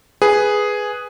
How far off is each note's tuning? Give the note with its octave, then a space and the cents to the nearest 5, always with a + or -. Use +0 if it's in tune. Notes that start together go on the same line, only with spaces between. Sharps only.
G#4 +0 B4 +0